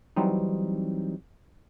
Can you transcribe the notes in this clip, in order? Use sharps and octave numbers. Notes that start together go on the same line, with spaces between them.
E3 F#3 G3 C4 D#4